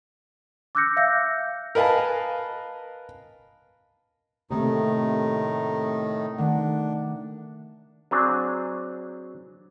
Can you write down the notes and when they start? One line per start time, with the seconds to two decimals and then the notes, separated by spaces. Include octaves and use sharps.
0.75 D6 E6 F#6 G6 A#6 C#7
0.97 E5 F5 E6 G6 A#6 C#7
1.75 A#4 B4 D#5 F5 G#5 A5
4.51 A2 C3 D#3 A3 A#3 D#4
6.38 D#3 A3 D4 F#5
8.11 F#3 C4 D4 G#4